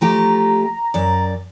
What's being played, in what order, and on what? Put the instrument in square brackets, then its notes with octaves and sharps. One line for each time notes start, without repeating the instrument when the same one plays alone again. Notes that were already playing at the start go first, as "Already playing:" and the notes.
[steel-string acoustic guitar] F3 A3 G4 [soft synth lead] A#5
[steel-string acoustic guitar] F#2 D5